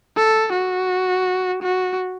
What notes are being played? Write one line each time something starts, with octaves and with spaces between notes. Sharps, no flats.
A4
F#4
F#4